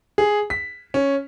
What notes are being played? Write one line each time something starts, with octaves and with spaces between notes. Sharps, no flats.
G#4
B6
C#4